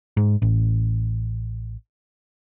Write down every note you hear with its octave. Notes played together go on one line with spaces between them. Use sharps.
G#2
A1